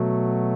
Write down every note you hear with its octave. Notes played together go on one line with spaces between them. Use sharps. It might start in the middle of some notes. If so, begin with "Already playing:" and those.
Already playing: B2 F#3 A3